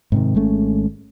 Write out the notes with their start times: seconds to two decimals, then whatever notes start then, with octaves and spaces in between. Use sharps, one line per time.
0.12 G#2 C3 D#3
0.35 G#1 G#3 A3 C#4